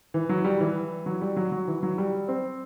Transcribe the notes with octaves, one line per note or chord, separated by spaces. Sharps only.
E3
F#3
G3
E3
F#3
G3
F#3
F#3
E3
F#3
G3
C4